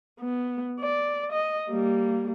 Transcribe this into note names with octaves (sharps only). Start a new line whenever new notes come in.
B3
D5
D#5
G3 A#3